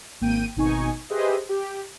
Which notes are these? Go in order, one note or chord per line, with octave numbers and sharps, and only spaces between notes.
G#1 A#3 G5 D#7
G#1 B2 D#4 G#5 C#6
G4 G#4 B4 C5 D#5 E5
G4